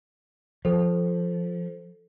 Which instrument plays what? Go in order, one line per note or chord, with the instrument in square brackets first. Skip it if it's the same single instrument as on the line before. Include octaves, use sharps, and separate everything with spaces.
[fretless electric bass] F3 [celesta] A4 C5